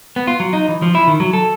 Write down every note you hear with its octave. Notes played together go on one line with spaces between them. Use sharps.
B3
F4
F#3
D#4
E3
F3
E4
D#3
F#3
A4